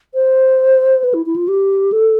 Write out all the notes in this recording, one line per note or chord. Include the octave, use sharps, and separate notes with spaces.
C5
B4
E4
E4
F4
G4
A4